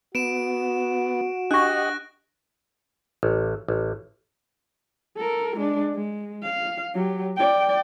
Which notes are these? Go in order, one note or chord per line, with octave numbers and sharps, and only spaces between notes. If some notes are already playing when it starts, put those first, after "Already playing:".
B3 F#4 D7 E7
D4 G4 D#5 F#5 C#6 F#6 A#6
A1
A1
A4 A#4
G#3 D4
G#3
F5
F#3 G4
D5 G5